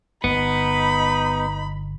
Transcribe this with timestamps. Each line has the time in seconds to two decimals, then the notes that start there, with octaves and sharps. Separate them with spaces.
0.24 G1 B3 D#4 B5